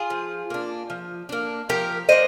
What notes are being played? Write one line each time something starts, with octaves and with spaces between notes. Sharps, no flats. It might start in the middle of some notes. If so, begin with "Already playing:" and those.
Already playing: F4 G#4
F3
A#3 D4
F3
A#3 D4
F3 G4 A#4
A#3 D4 C5 D#5